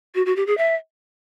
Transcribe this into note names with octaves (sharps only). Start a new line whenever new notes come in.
F#4
F#4
G4
G#4
E5